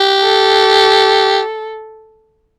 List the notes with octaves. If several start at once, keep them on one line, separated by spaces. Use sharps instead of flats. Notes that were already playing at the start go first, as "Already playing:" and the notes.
Already playing: G4
A4